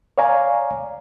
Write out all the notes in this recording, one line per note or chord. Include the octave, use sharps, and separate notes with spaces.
C#5 D5 F5 G#5 A#5